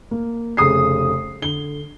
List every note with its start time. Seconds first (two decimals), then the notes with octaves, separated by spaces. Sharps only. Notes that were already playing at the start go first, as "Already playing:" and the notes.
0.11 A#3
0.57 F1 C#3 D#6 C7
1.42 D3 G7